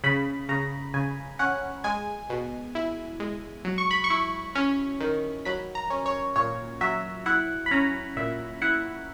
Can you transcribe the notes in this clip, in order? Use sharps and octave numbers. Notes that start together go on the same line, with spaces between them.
C#3 B5
C#3 A#5
C#3 G#5
C#4 F#5
G#3 G#5
B2
E4
G#3
F#3
C#6
B5
C#6
E4
C#4
D#3
F#3 B5
A#5
C#4
C#5
A#2 C#5
F#3 E5
E4 F#5
B5
C#4 A#5
A#2 E5
E4 F#5